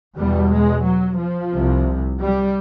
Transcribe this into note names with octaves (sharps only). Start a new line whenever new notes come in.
E2 B2 G3
G#3
F#3
F3
C2 C3
G3